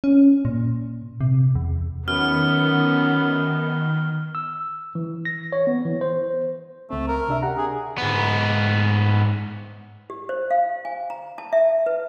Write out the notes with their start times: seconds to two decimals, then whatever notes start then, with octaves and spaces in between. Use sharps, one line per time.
0.04 C#4
0.45 A#2
1.21 C3
1.55 E2
2.08 F#2 D#3 B3 F6
4.35 E6
4.95 E3
5.25 A#6
5.52 C#5
5.67 B3
5.85 E3
6.01 C5
6.90 C#2 A3 C4
7.08 A#4
7.28 C3 D4 E5
7.42 G4 F#5 A#5
7.58 G#4
7.98 G#2 B3
10.10 G4
10.29 C5
10.51 F5
10.85 G#5
11.10 A#5
11.38 A5
11.53 E5
11.86 B4